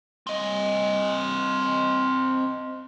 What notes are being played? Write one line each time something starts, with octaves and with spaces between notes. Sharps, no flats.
C4 D#5